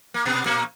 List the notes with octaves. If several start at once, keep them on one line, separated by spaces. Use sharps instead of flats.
A#3
B2 B3
A#2 A#3